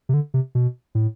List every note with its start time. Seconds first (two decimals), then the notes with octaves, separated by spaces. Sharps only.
0.09 C3
0.14 D3
0.34 C3
0.55 B2
0.95 A2